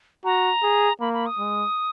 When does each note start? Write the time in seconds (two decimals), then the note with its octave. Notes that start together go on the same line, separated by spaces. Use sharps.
0.25 F#4 A#5
0.63 G#4
1.00 A#3 B5
1.14 B5
1.26 D#6
1.38 G#3